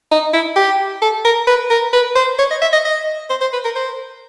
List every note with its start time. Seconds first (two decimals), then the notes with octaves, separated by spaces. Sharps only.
0.12 D#4
0.34 E4
0.56 G4
1.02 A4
1.25 A#4
1.47 B4
1.70 A#4
1.93 B4
2.16 C5
2.39 C#5
2.51 D#5
2.62 E5
2.73 D#5
2.85 D#5
3.30 C5
3.41 C5
3.53 B4
3.65 A#4
3.76 C5